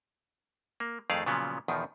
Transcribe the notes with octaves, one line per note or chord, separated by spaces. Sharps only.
A#3
F2 D#3 A3 G#4 D5 F5
A#2 C#3 F3 F#3 B3
E2 B2 D#3 F3